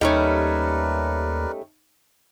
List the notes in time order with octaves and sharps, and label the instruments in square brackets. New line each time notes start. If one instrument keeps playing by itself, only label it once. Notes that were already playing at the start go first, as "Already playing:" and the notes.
[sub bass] D#2 [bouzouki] G3 A3 C#4 [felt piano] D#4 [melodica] A#4 B4 D5